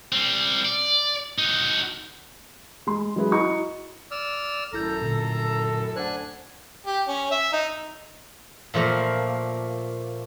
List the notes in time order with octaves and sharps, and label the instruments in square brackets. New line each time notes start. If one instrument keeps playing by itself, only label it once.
[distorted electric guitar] G3 C4
D5
D#4 F#4
[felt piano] G#3 C6
F#3 G#3 C#4 G#4 B4 E5
E4 F#4 D#5 A#5 C#6
[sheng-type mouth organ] D5 E6 F6
[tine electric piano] G#1 E4 G6 [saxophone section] F#2 A2 A4 [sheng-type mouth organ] A#5
[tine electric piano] A#2 D3
[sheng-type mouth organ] D4 G#5 F#6 [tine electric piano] C5 F#5
[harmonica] G4
C#4
E5
D#4
[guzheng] A#2 F3 A3 A#3